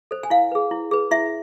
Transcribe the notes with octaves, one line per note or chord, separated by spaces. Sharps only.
A4 C5
G#5
E4 F5
G#4 B4
E4
G#4 B4
E4 E5